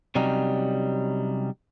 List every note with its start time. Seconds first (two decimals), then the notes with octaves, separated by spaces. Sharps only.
0.15 C3 F#3 G3 C#4 D#4